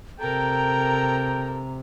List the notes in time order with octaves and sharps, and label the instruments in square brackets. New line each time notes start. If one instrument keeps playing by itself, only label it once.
[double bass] C3 [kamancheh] A4 A#4 [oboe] G5 [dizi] A#5